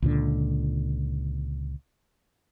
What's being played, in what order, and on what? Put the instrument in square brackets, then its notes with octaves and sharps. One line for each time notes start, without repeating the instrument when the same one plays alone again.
[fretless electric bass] C#2 A#2 D3